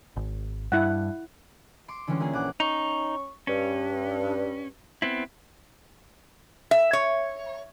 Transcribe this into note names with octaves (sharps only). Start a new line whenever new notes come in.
G#1
G2 E4 F#5
C6 D6 D7
D3 E3 G3 G#3 C#4
A#3 E4 F4 G#4
A#1 F#5 D6 F#6
C#4 D#4 C#6
G2 C#4
B3 C4 E4
E5
C#5